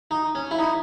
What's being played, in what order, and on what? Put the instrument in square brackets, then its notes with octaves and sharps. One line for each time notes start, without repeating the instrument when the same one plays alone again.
[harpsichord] D#4
C#4
E4
D#4